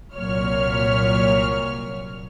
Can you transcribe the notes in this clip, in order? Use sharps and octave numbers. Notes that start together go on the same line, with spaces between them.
C2 A#2 F#3 C#5 F6